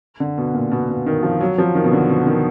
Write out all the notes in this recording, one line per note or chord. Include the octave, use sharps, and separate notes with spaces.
D3
B2
A#2
B2
B2
D#3
F3
F#3
F3
D#3
B2
D3
B2
D#3